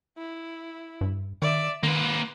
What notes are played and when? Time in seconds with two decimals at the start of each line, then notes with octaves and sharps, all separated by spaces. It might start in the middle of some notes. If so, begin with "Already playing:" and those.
0.17 E4
1.01 G2
1.42 D#3 D5 E5
1.83 D#3 A#3 B4 C6